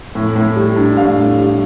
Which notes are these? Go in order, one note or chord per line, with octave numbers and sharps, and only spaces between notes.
A2
A2
G3
D4
A2 F5
A2
G3